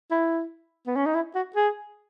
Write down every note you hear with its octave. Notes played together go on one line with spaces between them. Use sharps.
E4
B3
C#4
D#4
E4
F#4
G#4